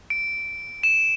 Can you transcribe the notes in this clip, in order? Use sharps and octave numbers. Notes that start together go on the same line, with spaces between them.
D7
E7